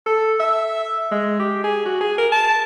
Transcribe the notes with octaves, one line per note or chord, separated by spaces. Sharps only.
A4
E5
G#3
G4
G#4
F#4
G#4
A#4
A5